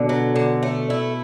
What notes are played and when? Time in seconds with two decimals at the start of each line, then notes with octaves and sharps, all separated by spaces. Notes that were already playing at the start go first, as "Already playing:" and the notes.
Already playing: B2 D3
0.09 F#3
0.36 D3
0.63 A3
0.90 E4